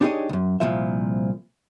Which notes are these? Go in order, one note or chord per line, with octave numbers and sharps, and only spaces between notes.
D4 D#4 G4 G#4 C#5 D#5
C2 F#2
C2 A#2 F3 E5